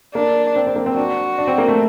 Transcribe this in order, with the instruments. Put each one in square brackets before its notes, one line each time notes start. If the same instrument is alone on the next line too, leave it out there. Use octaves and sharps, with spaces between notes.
[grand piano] A#3 [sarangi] D4
[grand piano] C4
C4
A#3
C4
[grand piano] D4 [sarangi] F#4
[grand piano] D4
C4
A#3
A3